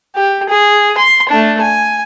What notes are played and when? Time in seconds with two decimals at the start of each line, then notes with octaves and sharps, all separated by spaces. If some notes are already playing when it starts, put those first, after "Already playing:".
0.15 G4
0.49 G#4
0.97 C6
1.29 A3 D4
1.62 G#5